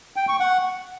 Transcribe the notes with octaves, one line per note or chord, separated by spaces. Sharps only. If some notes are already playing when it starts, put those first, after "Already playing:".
G5
C#6
F#5